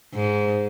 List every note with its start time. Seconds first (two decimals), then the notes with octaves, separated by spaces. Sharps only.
0.14 G#2